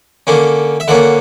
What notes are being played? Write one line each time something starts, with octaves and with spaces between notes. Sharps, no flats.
D3 A#3 C#4
E5
D3 A#3 C#4 F#5